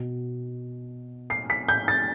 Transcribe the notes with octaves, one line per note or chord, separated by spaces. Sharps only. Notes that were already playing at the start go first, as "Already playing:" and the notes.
Already playing: B2
C7
B6
G6
A6